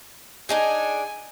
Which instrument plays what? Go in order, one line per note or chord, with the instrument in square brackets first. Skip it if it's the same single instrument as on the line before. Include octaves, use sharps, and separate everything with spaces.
[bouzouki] D4 D#4 G#4 [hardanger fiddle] G#5